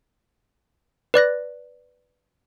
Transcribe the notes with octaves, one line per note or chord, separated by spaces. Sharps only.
B4 D5 F#6 A#6